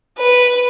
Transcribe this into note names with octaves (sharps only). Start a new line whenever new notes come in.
B4